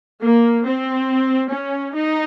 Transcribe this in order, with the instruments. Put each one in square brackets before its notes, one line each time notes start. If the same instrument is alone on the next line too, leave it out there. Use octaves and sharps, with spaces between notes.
[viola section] A#3
C4
C#4
D#4